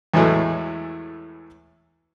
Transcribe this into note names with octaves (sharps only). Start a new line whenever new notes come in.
E2 A2 E3 F#3 G#3 A3